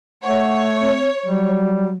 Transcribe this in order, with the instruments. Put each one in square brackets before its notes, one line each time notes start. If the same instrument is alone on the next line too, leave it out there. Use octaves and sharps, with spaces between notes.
[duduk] A3 [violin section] C#5 [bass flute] F#5
[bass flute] C4
[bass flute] F#3 [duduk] G3